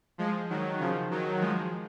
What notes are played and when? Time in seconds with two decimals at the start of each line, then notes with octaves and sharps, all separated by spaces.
0.18 F3 G#3
0.50 D#3 F#3
0.79 C#3 F3
1.11 D#3 F#3
1.41 F3 G#3